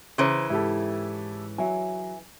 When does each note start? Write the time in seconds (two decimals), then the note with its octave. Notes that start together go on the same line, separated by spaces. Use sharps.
0.18 C#3 E3 C5 A#5 C6
0.50 G#2 E4 G4 A4
1.58 F#3 E5 G#5